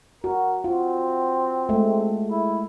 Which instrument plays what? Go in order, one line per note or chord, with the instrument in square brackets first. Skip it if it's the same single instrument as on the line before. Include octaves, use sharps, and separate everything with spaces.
[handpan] F#4 [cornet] A#4
[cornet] C4 [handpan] F4
[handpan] G#3 A3
[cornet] E4